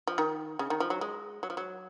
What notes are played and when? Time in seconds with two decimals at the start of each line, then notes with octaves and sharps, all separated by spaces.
0.07 F3
0.18 D#3
0.59 C#3
0.70 D#3
0.80 F3
0.90 F#3
1.01 G#3
1.43 F#3
1.50 F3
1.57 F#3